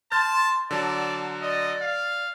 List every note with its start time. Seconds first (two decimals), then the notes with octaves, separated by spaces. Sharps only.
0.12 A5 C6 F6 G6 A6
0.71 D3 F#3 D5 A5
1.42 D5 D#5
1.81 F5